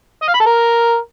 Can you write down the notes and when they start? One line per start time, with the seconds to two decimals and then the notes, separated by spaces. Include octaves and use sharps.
0.22 D#5
0.28 F5
0.34 B5
0.40 A4
0.46 A#4